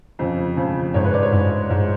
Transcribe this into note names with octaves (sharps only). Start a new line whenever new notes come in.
F2 C#3
F2 C#3
G#2 C#5
B4
D5
C#5
G#2
G#2